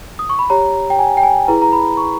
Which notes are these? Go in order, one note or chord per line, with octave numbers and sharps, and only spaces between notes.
D#6
C#6
B5
G4 C#5 A#5
G5
G#5
G5
G#5
E4 G#4 B4 A#5
A#5
B5
C#6